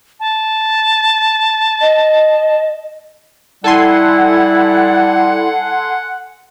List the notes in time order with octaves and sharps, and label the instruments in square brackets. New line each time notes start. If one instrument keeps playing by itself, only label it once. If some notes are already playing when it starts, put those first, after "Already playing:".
[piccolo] A5
[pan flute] D#5
[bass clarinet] G3 [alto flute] E4 [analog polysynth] A4 G#5 C6 [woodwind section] F#5